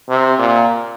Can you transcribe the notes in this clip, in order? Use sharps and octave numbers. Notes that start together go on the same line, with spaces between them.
C3
A#2